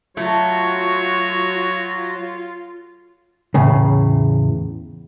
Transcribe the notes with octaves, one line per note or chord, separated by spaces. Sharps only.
F#3 A3 F4 F#4 C#5
E2 A2 C#3